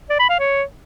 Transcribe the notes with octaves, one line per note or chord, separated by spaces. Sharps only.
D5
B5
F5
C#5